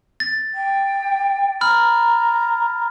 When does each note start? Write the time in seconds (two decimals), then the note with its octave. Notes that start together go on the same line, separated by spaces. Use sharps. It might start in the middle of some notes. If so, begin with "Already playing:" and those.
0.20 A6
0.54 G5
1.61 A#5 B5 F6